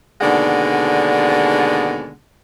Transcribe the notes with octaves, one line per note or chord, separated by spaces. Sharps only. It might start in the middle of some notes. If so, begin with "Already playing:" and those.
D#2 B2 D3 G#3 D4 F#5